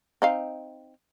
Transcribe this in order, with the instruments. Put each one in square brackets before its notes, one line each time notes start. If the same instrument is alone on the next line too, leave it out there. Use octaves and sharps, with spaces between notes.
[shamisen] C4 D#4 F5